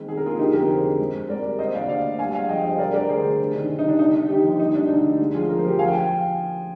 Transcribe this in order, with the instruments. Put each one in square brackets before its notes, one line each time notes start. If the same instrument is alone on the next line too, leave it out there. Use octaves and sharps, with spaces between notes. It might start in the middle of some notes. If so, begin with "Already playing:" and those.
Already playing: [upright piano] D#3 G#3 C4
A#2 G#4
A#4
A#2 F4 G#4
D3 D#4 G4
F2 G4 A#4
D3 G#4 C5
D3
G#2
C4
G#2 A#4 D5
G3
A#3 C5 D#5
D2 D5 F5
D2 D5 F5
A#3
G2 F5 G#5
G#3 F5 G#5
F3 D#5 G5
G2 C5 D#5
D2 A#4 D5
D3 A#4 D5
D2 G#4 C5
D3
C3
D#3
D#3
D#4
C2 D4
D3 D#4
D3
D#2 D#4 G4
F3
G3 D#4
D2 D4
D3 D#4
D2
G#3
F3 F4 G#4
F3 A#4
C5
F3 G4 A#4
F3 F5 G#5
G5
G#5